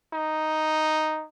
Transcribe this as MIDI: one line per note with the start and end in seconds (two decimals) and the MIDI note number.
0.13 1.25 63